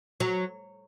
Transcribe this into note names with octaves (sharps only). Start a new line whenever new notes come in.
F#3